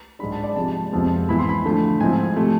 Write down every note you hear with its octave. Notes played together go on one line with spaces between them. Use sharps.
G#2 G#3 D4 B5
A5
D5
C3 F3 G#3 A5
F2 C3 F3 G#3 B3
G#2 E3 B3 E4 B5
C6
B5
D3 F3 A3
G#2 F3 G#3 C4 E4 G#5
C3 F3 A3